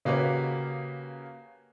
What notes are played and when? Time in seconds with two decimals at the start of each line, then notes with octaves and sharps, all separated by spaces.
0.05 C#3 A#3 F#4 G4 B4 C#5